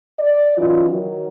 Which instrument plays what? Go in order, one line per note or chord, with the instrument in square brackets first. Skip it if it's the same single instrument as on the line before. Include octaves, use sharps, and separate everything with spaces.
[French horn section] D5
E3 F#3 C#4 D#4 F4
D#3 F#3